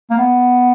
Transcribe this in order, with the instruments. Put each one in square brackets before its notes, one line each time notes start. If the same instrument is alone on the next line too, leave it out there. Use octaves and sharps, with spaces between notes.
[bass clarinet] A#3
B3